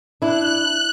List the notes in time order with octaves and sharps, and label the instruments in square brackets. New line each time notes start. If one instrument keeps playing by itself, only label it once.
[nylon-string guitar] D4 E4 [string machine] F#6